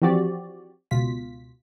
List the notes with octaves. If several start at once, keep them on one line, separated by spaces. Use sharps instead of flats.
E3 F3 C4 F#4 G4 D5
C#2 B2 F4 B6